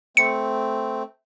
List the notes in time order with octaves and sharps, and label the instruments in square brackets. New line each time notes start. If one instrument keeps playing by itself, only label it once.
[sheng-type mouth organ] A3 C4 [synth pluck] C#7